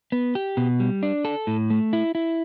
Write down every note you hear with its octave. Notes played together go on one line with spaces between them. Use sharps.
B3
G4
B2
G3
D4
A4
A2
A3
E4
E4